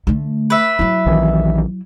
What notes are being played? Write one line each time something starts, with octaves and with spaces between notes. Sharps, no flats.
D3 A3
B4 E5
F#3 E4
A#1 D#3 E3